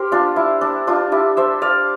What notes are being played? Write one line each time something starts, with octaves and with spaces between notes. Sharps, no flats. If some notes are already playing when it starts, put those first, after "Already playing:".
Already playing: G4 A#4 C5
D4 F4
E4
D4
D4 F4
E4 G4
C5 E5
D5 F5